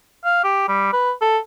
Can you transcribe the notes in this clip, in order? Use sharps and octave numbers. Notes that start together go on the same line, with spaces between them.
F5
G4
G3
B4
A4